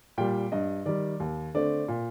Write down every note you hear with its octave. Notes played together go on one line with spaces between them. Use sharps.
A#2 G3 G5
G2 D#5
D#3 G3 D5
D#2
D3 A3 C4 D5
A#2